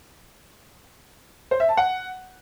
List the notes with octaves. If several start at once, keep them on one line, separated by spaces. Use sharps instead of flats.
C5
E5
A5
F#5